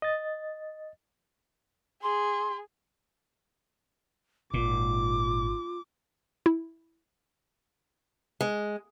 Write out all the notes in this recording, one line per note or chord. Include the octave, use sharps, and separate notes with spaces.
D#5 A6
G#4 C6
G#1 A#2 F4 D6
E4
G#3